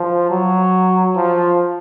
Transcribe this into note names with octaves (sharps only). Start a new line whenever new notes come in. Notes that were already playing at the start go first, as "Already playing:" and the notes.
Already playing: F3
F#3
F3